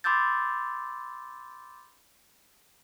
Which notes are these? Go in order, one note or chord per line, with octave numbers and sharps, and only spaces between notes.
B5 C6 D6 E6 G6 A6